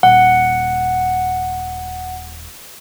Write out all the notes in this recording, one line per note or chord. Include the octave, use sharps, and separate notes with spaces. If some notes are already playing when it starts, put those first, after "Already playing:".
D#1 F#5